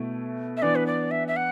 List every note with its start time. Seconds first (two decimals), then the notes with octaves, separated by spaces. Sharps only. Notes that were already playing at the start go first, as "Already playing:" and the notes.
Already playing: B2 A3 E4
0.57 E5
0.62 E3 B3 D4 D5
0.75 B4
0.86 D5
1.11 E5
1.28 E5
1.36 F#5